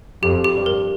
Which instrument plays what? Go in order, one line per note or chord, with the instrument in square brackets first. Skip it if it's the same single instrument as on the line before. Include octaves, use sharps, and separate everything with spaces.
[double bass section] F2 [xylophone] G4
[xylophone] G4
[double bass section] G2
[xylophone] A#4